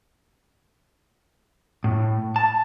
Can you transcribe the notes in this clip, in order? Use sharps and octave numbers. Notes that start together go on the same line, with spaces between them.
A2
A5